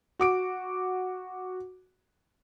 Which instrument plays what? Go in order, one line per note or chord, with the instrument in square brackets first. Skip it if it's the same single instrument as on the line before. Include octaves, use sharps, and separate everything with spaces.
[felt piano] F#4 D6 D7